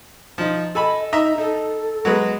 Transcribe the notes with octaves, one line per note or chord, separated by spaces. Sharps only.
F3 D#4
A4 D#5 G#5 B5
D#4 D#5 E5 A#5
D#4 A4
F#3 G#3 B3